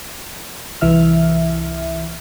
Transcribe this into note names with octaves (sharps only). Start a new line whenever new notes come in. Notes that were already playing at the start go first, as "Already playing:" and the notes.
C2 E3 E5 F6